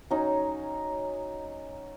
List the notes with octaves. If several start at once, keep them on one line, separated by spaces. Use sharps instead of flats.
F#3 C#4 D#4